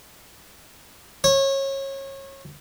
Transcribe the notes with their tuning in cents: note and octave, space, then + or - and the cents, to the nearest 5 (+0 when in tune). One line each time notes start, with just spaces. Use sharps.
C#5 -25